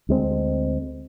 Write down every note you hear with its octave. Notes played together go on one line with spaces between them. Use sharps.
D2 G#3 C4